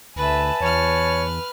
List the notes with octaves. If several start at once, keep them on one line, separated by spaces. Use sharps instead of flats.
D2 B4 E5 G#5 A5
E2 B4 C#5 F6